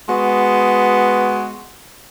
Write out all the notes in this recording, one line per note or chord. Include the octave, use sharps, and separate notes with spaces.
G#3 B3 F#4